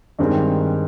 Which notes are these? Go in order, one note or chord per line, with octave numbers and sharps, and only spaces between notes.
G2 D#3 G#3 C4